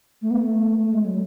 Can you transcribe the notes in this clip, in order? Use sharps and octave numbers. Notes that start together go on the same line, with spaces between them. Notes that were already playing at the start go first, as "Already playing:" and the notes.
A3
B3
A3
A3
G#3
F#3